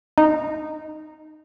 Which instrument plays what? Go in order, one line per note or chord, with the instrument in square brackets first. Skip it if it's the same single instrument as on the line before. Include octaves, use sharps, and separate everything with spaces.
[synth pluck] D#4